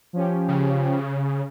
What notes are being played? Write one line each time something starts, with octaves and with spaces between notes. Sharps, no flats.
F3 C#4 G4
C#3